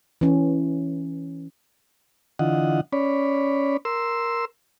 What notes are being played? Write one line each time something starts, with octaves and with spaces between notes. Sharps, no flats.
E3 C#4
D3 E3 F4 D#5 F#5
C#4 C#5 D5 B5
A#4 C6 E6